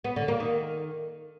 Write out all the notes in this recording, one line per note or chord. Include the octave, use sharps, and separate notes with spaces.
B3
D3
A#3
D#3